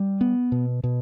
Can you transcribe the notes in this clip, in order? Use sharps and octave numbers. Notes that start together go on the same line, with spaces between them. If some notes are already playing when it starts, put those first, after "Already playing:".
Already playing: G3
B3
B2
B2